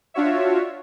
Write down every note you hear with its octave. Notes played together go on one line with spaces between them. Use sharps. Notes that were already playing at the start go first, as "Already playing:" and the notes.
D4 F4 F#4 C#5 E5